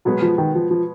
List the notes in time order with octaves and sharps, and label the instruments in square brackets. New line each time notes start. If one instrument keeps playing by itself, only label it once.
[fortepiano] B2 G#3 B3 [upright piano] F#3
[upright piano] F3
D#3
F3
F3